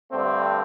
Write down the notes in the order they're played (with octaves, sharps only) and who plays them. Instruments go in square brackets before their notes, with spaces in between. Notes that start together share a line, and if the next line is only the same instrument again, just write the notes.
[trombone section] G2 D3 A3 C4